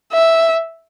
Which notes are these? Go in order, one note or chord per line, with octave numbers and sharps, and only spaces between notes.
E5